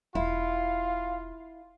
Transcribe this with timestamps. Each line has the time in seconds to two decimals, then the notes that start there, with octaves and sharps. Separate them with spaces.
0.15 E1 E4 F4 F5